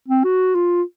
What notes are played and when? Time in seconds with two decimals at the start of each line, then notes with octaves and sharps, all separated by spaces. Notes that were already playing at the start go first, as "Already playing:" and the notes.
0.08 C4
0.24 F#4
0.55 F4